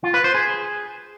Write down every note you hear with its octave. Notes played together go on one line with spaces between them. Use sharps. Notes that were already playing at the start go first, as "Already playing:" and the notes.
F4
B4
C5
G#4